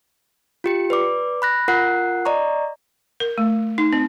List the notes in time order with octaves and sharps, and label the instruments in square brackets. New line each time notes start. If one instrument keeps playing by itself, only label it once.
[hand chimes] F4 G4 C#7
B4 D5 D6
B5 F#6 A#6
F4 A#4 F#5 F#6 C7
D5 D#5 A#5 C#6
[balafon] A#4
A3
D#4
C4